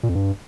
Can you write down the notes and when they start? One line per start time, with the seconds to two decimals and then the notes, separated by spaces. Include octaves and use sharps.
0.03 A#2
0.09 F2
0.15 G2